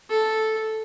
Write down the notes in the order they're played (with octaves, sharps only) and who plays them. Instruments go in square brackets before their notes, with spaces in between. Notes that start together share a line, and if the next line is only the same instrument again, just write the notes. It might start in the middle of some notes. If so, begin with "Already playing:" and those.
[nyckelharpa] A4